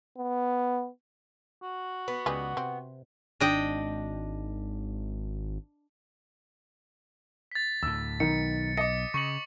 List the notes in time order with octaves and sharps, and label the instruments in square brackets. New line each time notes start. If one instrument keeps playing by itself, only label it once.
[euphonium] B3
[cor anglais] F#4
[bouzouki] B3
[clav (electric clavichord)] C#2 D5 D#5 [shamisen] G4 G#4 B4
[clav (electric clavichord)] C3 [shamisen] C4
[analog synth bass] G#1 [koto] D4 D#5 G5
[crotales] A6 B6
[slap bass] D2 A2 [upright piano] E6
[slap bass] B1 [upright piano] D#3 [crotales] C#7
[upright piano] D#5 [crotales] D6 C#7
[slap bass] C#3 [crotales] C#6 C#7 F#7